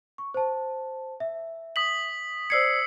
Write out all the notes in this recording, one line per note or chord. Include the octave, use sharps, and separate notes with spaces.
C#6
C5 A5
E5
D#6 B6 F#7
C5 D5 E6 G#6 C7 C#7